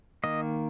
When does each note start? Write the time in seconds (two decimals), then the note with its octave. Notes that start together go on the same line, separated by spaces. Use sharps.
0.24 D#3 A#3 D#5